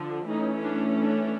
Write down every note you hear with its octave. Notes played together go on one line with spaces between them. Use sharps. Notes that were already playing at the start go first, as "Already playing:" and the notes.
Already playing: D3 F3 D4
E3 A3 C#4 D#4
D4
D4